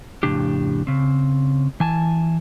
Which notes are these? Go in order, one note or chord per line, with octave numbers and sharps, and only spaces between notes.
F2 A2 C#3 D4 G4
C#3 C4
E3 G#5 A5